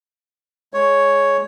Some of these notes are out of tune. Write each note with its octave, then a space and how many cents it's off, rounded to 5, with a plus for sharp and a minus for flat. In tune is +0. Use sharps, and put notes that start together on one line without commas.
G#3 +15 C#5 +0